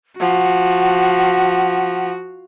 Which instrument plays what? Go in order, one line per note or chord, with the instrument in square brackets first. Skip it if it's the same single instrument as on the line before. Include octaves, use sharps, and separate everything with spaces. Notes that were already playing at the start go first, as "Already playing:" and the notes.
[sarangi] F3 [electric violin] F#4 [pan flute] F#5